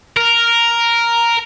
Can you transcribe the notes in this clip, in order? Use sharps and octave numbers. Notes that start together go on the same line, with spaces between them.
A#4